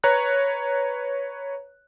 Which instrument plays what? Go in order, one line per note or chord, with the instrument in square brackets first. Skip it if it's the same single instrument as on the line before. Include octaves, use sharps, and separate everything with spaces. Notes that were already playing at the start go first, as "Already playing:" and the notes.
[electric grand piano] B4 C#5 A#5 F#6